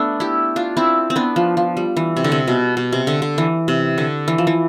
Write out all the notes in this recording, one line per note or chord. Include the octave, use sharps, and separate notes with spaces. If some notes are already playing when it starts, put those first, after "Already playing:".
Already playing: A3 B3 D4
E4 G4
D4 F4
C4 E4
C4
B3 D4
F3
F3
G3
E3
C3
D3
C3
B2
B2
C3
D3
D3
E3
C3
D3
E3
F3
E3